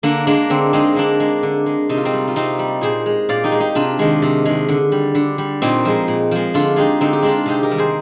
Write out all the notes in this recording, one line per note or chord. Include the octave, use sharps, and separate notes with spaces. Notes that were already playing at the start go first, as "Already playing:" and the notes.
D3 A#3 D4
G#3 A#3 D4
D3 C4
G#3 C4 D#4
D3 A#3 D4
G#3
D3
G#3
C3 D#4
F4
C4 D#4
G3
F4
C3 C4 D#4
G3
A#2 G#4 C5
G#3
A#2 D5 F5
D#4 G4
G#3
D#4 G4
C3 D4 F4
D#3 G#3
C3
D#3 G#3
D3
G3
D3
G3
A#2 C4 D#4
F3 G#3
A#2
F3 G#3
D3 D4 F4
G#3 D#4 G4
D3 C4 D#4
G4
G#3 D4 F4
C3 D#4 G4
G4 A#4
D#3 G3
G#4 C5